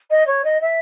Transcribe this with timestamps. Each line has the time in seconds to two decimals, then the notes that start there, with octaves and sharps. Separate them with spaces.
0.10 D#5
0.26 C#5
0.44 D#5
0.61 E5